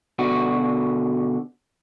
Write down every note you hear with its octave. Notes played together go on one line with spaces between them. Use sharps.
B2 D3 F#4